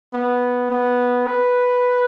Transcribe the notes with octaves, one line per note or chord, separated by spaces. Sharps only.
B3
B3
B4